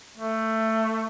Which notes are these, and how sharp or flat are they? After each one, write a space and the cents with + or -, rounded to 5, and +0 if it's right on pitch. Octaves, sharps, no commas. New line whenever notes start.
A3 +15